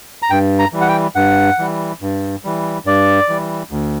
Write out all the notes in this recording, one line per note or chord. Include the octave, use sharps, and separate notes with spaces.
A#5
G2 G5
A#5
E3 G3
F#5
G5
G2 F#5
E3 G3
G2
E3 G3
G2 D5
E3 G3
D2